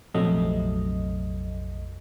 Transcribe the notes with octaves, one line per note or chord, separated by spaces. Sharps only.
A#1 F2 C3 F#3 A3 D#5